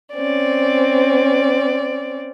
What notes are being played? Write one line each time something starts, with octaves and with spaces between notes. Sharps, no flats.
C4 C#4 D5